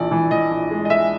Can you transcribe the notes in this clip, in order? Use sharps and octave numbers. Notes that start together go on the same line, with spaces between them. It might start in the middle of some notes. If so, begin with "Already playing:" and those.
Already playing: A#1 E3 D5
E3
E3 D#5
A#1
G#3
D#5
G#3 E5